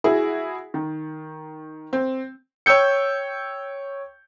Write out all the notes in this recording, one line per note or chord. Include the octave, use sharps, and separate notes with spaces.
E4 F#4 G#4
D#3
C4
C#5 G5 E6 G6 C#7